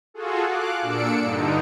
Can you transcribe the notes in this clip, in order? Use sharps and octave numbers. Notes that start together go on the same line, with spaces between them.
F4 F#4 G#4 A4
F5 D6 F#6
A#2 D4 E6 C#7 D7
G2 D3 D#4